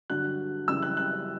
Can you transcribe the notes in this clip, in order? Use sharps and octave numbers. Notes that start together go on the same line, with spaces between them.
G2 D3 F#3 F#6
F#2 C#3 E3 G3 E6
F#6
F#6